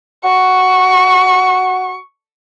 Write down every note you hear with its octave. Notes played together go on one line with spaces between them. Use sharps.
F#4 C#6